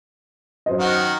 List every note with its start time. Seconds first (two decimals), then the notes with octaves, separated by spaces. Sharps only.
0.66 F#2 C5 D#5
0.80 D#3 F#4